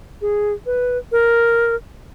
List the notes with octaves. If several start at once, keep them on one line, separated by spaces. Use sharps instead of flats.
G#4
B4
A#4